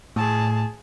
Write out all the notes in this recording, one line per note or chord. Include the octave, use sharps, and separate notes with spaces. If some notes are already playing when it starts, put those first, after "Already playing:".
A2 G#4 A5